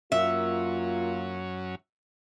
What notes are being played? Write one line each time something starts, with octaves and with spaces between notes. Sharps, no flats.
F#2 F#3 A#3 C#4 F4 E5